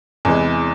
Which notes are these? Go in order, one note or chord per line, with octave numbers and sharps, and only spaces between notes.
E2 C3 E3 G#3